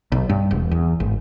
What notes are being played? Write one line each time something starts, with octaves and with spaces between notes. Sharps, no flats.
B1
G2
E1
E2
G#1